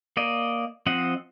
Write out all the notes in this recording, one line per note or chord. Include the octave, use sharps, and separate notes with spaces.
A#3 D5 D#5
F3 C4 D#5 F#5